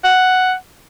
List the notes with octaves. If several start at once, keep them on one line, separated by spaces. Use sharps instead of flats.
F#5